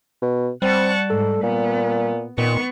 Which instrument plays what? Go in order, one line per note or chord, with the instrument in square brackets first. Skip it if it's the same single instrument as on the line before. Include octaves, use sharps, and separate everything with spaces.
[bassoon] B2
[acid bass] G3 [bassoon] C4 [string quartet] F#5 A5 C#6
[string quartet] G#2 [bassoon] A4
[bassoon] A#2 [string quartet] B3
[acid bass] A#2 [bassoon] D#3 [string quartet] B3 C#6